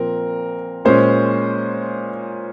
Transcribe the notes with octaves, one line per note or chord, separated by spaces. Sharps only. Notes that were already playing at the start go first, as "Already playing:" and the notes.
Already playing: A#2 F3 C4 A#4
A#2 G#3 C#4 C5